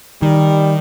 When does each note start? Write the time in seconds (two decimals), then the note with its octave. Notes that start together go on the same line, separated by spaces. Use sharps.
0.22 D#3 G3